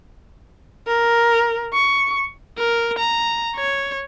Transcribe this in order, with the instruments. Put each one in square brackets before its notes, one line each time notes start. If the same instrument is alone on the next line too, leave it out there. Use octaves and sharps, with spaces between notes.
[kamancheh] A#4
C#6
[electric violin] A#4
A#5
C#5